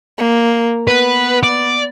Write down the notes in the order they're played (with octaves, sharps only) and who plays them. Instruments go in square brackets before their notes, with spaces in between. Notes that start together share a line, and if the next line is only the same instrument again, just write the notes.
[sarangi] A#3
[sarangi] B3 [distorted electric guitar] B4
[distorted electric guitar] D5